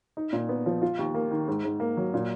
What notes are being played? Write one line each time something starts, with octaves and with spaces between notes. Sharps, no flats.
D#4
A#2
B3
F3
F4
D#2
A#3
D#3
G#2
G#2
A#3
F#3
A#2